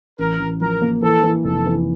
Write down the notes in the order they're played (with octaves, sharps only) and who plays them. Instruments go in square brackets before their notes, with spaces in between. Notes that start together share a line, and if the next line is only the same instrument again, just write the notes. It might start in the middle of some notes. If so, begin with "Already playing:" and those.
[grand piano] A1 [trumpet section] A#4
[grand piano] A1
[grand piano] F3 [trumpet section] A#4
[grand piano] A#3
[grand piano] E3 [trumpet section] A4
[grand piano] E3
[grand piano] F1 [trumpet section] A4
[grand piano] E3